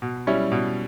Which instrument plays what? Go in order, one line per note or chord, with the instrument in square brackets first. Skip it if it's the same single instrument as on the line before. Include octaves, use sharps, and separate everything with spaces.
[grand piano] B2
G3 C#4 E4
B2